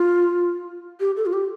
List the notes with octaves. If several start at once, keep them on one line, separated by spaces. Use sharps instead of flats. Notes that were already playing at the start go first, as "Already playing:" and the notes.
Already playing: F4
G4
A4
F4
G4